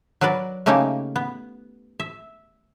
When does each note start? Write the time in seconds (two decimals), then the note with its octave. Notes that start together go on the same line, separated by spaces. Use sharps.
0.21 F#3 F#4 A#4 B4 D5
0.66 C#3 A3 A#3 C#4 D#4 G4
1.16 B3
2.00 E5